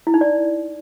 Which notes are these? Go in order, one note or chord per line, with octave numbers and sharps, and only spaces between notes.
E4
D#4
D5